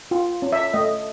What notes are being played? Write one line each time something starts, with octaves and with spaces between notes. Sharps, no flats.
F4
C#4
E5
A3 D#5